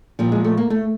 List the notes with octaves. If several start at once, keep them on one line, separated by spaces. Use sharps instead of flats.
A#2 F3 G3
G#3
A3
A#3
A3